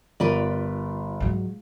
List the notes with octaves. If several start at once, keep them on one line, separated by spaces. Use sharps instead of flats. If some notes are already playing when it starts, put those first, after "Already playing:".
G1 F4 A#4 B4 D5
G#2 F#3